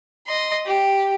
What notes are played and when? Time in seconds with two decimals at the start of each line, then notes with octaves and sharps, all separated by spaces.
0.27 D#5 C6
0.66 G4